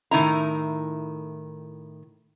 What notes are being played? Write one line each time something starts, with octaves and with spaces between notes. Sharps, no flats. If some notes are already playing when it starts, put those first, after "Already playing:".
A2 D#3 E4 A#5